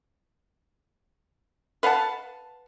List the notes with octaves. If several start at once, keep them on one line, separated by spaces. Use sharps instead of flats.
B4 F5 F#5 A5